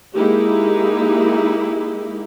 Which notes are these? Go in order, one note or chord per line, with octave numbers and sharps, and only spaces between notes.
G#3 A#3 D#4 E4 G4